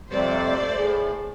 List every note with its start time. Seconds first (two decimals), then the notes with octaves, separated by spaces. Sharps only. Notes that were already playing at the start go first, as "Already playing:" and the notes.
0.11 F2 C3 G3 A3 C5 D5
0.77 A2 G#4